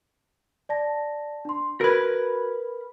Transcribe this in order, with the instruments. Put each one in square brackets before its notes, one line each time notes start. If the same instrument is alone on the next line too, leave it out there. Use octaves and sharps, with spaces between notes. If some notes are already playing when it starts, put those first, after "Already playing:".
[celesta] D5 A5 A#6
D4 C6
[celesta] F#4 G#6 [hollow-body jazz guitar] A#4 B4